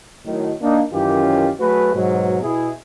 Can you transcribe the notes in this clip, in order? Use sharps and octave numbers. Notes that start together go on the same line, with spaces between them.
A2 D#3 F#3
A#3 D4 D#4
F#2 D#3 E3 C#4 F4 G4
F#3 A3 F#4 G#4 B4
G#2 B2 F#3
B2 E4 G#4